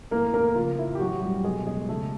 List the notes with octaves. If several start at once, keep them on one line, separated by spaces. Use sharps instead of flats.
A2 E3 A#3 A#4
A#3 A#4
C#3 F3 F4
E4
G4
A2 E3 F#3 F#4
G3 G4
B2 F#3 G#3 G#4
G#3 G#4
C#3 F#3 A3 A4